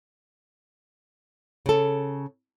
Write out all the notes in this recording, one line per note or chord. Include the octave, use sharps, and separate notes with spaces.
C#3 A4